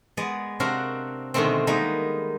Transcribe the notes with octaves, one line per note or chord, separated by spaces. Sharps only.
G#3 B3 D5 D#5
C3 C4 D4 F#4 A#4 F5
B2 D3 D#3 G#3 A3 C4
G3 G#3 A#3 B3 D#4